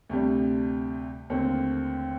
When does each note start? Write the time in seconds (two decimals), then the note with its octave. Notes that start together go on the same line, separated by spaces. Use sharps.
0.09 D2 C3 G3
1.30 D#2 D3 A3 C4